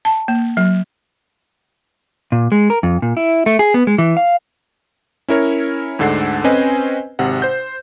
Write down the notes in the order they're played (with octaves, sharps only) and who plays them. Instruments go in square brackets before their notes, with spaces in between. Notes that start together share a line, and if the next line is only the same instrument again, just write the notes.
[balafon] A5
A#3
F#3
[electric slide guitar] A#2
G#3
A#4
F2
A#2
E4
A3
G#4
B3
G#3
E3
F5
[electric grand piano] C#4 E4 A#4 C#5
D2 G#2 D3 A4 F#5 C7
C4 C#4 B4 C5 D#5 G#5
G#1 C3 F#5
C5 G6